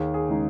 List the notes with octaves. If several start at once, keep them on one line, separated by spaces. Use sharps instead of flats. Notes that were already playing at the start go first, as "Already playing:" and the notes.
Already playing: D#2 G#4
G#4
C#3 G#3 D#4